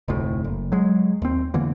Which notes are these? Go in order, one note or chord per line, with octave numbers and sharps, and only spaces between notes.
F1 D2 A2
F#1
F#3 G#3
D#2 C4
E2 D3 E3 A#3